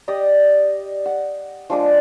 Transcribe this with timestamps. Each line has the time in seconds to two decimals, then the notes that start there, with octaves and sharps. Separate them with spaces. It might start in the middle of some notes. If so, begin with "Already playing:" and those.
0.08 G4 D5 D#5 D#6
1.06 F#5
1.70 F3 G#3 D4 D6